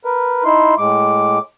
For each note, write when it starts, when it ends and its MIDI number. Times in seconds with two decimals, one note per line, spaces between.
0.05 0.44 70
0.05 0.44 71
0.44 0.75 63
0.44 0.75 64
0.44 0.75 84
0.78 1.39 45
0.78 1.39 56
0.78 1.39 86